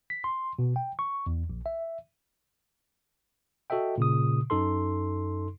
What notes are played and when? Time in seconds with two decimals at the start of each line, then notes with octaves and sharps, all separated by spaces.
0.10 B6
0.24 C6
0.59 B2
0.76 G5
0.99 C#6
1.27 E2
1.50 A#1
1.66 E5
3.70 F#4 A4 D#5 E5 G5
3.98 A#2 C#3 D#6
4.50 F#2 D#4 A4 C6